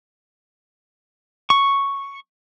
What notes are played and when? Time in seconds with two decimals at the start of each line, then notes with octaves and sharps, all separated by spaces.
1.50 C#6